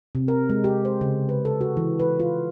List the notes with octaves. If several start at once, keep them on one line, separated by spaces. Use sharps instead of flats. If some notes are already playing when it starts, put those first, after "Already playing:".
C3
A#4
G#3
G4
C5
C#3
B4
A4
F#4
E3
B4
F4